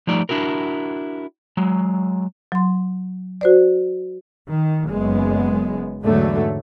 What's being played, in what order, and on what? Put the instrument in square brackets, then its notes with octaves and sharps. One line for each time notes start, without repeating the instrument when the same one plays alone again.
[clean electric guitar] F3 G3 A3 D#4 D5
D4 E4 F#4 A#4
F#3 G#3
[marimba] F#3 C6
F#4 C5 D5
[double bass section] D#3
F#1 F#2 G#3 B3
E2 G#2 D3 F#3 A3